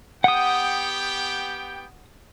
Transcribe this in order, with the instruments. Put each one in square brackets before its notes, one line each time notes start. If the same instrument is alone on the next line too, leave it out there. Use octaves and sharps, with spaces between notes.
[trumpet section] B3 G4 G5 [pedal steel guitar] F#5 D#6